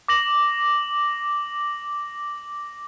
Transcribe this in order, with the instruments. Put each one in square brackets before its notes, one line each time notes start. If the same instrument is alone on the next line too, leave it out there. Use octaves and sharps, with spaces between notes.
[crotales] D6 A#6 F#7